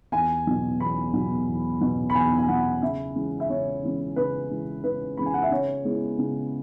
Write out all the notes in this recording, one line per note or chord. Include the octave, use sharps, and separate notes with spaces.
E2 G#5
B2 F#3
E2 B5
B2 F#3
E2
B2 F#3
B5
E2 G#5
G#5
B2 F#3 F#5
C#3 E5
E3 G#3 C#4
E5
C#3 C#5
E3 G#3 C#4
C#3 B4
E3 G#3 C#4
C#3 B4
E3 G#3 C#4 B5
G#5
F#5
E5
C#3 C#5
G#3 B3 E4
C#3